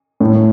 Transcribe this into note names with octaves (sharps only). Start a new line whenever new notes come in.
A2